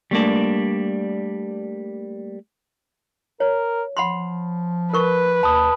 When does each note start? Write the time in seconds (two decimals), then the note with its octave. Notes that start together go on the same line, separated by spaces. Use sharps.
0.11 G3 A3 A#3 D4
3.40 A#4 C#5
3.97 F3 F#5 B5 C6
4.94 A#4 B4 C#6
5.43 D#2 A5 B5 D#6